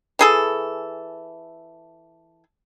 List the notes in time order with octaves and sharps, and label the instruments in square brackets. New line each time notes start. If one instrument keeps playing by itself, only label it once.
[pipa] E3 G#4 A4